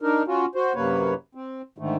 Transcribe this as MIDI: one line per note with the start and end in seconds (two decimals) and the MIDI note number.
0.02 0.23 62
0.02 0.23 63
0.02 0.23 70
0.27 0.46 61
0.27 0.46 65
0.27 0.46 66
0.55 0.73 66
0.55 0.73 72
0.75 1.14 42
0.75 1.14 48
0.75 1.14 58
0.75 1.14 71
0.75 1.14 73
1.35 1.62 60
1.78 1.97 44
1.78 1.97 50
1.78 1.97 51
1.78 1.97 57